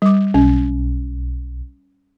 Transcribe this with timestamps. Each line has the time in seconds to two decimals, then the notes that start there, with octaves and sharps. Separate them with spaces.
0.02 G3 D6
0.34 B1 C#4